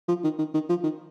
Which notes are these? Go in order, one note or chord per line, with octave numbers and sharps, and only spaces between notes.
F3
D#3
D#3
D#3
F3
D#3